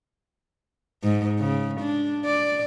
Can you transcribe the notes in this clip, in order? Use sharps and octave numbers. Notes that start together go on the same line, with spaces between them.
G#2
C#3
D4
D5